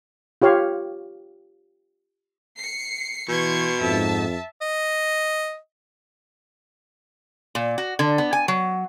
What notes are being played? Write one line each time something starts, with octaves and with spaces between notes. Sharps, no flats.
F4 G4 C#5 F5
C7 C#7
B2 E3 C6 C#6 G#6
F2 G#2 E5 A5
D#5
A#2
F#4
D3
B3
G#5
F#3